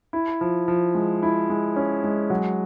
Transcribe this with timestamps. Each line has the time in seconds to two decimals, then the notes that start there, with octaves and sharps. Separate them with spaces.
0.13 E4
0.41 F3
0.68 F3
0.95 G#3
1.23 E4
1.50 G#3
1.76 C#4
2.04 G#3
2.30 F#3